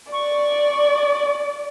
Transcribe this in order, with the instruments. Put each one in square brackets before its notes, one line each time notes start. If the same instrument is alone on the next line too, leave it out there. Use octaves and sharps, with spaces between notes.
[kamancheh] D5 [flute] C#6